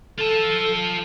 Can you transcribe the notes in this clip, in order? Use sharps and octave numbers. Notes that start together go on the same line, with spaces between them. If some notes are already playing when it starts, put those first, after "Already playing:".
F4 A4 A5